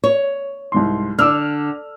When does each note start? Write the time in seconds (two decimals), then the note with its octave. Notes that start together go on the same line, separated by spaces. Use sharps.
0.04 C#5
0.72 C2 G#2 C6
1.19 D3 D6 E6 F6